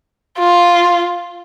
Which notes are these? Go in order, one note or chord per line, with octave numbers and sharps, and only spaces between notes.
F4